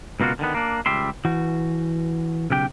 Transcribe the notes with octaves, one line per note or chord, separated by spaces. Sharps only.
C#2 B2 A#3 F4 F#4
D3 D#3 B3
A#3 D4
C#2 G3 G4 E5 C6
E3 F#4
B1 C#3 G4 G5